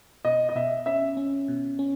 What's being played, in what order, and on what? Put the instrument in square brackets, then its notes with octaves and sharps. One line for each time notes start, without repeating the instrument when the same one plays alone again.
[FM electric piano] B2 [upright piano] D#5
[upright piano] D#5
[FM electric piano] B2 [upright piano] E5
[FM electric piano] C#4 [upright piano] E5
[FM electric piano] C#4
B2
C#4